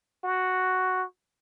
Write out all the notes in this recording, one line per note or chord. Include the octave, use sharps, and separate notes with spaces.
F#4